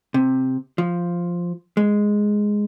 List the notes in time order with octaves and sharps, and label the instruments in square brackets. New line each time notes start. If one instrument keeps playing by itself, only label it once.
[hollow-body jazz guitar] C3
F3
G#3